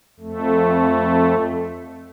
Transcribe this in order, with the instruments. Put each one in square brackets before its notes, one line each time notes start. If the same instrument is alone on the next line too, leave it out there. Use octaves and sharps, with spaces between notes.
[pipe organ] F2 A3